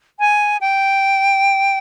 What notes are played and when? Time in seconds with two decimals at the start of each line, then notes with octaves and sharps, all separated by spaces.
0.20 G#5
0.61 G5